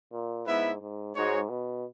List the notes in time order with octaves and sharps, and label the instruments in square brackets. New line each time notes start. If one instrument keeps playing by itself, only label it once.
[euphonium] A#2
[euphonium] G#2 [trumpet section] B3 E4 B4 E5
[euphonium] G#2
[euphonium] G#2 [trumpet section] G#3 D#4 F#4 C#5
[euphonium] B2